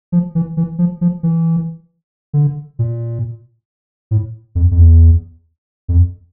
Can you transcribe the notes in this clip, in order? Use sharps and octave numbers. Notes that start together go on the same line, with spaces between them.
F3
E3
E3
F3
F3
E3
D3
A#2
A2
F2
F2
E2
F2